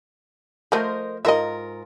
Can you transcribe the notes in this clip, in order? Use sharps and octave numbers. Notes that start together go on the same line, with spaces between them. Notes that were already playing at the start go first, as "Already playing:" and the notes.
F3 A3 A#4 C5 D#5
G#2 F4 A#4 D#5 E5